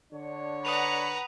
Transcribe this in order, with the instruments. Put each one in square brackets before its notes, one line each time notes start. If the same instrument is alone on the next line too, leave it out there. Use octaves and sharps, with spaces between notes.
[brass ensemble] D3 D4 C#5
[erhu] B4 [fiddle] F#5 A#5 [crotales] D#6 D#7 F7